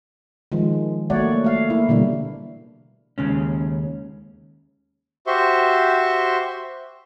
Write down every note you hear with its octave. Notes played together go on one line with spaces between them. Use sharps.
D#3 F3 G#3
F#3 A3 A#3 C#5 D5 F#5
A3 F5
A#3 E4
B2 D3 E3 G3
D#2 C#3 G#3 C#4
F#4 G4 C5 E5 C6 C#6